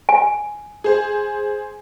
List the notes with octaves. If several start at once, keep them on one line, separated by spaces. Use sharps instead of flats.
G#5
G#4 C5